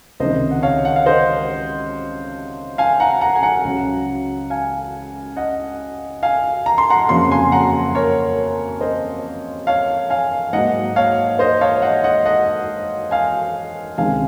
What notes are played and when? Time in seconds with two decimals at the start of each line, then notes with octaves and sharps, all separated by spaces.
0.20 C#2 C3 D#3 C5 D#5
0.51 F#5
0.63 C#5 F5
0.85 F#5
0.96 F5
1.06 C5 D#5
2.78 F5 G#5
3.00 F#5 A#5
3.21 F#5 A#5
3.35 G#5
3.42 F#5 A#5
3.65 C#2 C#3 F#3
4.50 F5 G#5
5.36 D#5 F#5
6.23 F5 G#5
6.66 A#5
6.78 C6
6.90 F#5 A#5
7.09 F2 C#3 F#3 A#3 C6
7.31 G#5 C6
7.52 F#5 A#5
7.95 A#4 C#5
8.81 C5 D#5
9.67 C#5 F5
10.10 F5 G#5
10.53 G#2 F#3 A#3 D#5 F#5
10.96 C#5 F5
11.39 C5 D#5
11.61 C#5 F5
11.82 D#5 F#5
12.04 D#5 F#5
12.25 D#5 F#5
13.11 F5 G#5
13.97 C#2 C3 D#3 G#3 F5 G#5